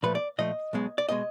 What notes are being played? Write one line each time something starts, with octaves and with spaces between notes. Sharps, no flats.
A#2 F3 A3 B4
D5
A#2 F3 A3 D#5
B1 B2 G#3
D5
B2 G#3 D#5